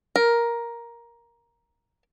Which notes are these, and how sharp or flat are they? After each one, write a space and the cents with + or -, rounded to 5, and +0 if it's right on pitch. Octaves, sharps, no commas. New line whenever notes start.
A#4 +10